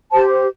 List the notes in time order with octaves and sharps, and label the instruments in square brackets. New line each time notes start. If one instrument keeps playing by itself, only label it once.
[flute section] G4 C5 A5